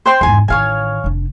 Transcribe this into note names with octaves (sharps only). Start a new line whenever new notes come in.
C5 G5 C6
E2 G#2 G#5 C6
A1 D#3 C#5 F5 G#5
F1 D4